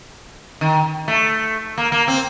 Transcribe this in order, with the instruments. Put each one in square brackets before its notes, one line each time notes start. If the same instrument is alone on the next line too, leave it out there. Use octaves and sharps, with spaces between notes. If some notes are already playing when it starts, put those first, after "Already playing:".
[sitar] D#3
A3
A#3
A#3
C4